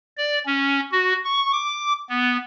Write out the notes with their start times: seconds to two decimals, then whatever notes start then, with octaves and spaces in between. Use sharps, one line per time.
0.17 D5
0.46 C#4
0.92 F#4
1.24 C#6
1.52 D6
2.09 B3